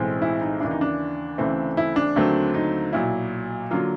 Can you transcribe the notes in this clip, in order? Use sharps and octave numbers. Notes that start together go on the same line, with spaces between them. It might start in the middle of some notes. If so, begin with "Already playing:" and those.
Already playing: B1 A2 E3 G#3 C4
E4
D#4
D#2 C#3 E3 D4
D#4
D4
D2 C#3 E3 A3 C4
E4
D4
D#2 D3 F#3 A3 C4
D#4
B1 A#2 F#3 E4
D3 F#3 A#3 F4